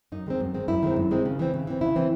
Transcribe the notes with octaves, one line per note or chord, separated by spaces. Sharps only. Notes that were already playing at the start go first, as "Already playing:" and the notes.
F#2 D#4
D#3 G#3 C4
F#2
D#3 G#3 C4
F#2 E4
D#3 G#3 C4
F#2
D#3 G#3 C4
C#3
E3 C4
C#3
E3 C4
C#3 E4
E3 C4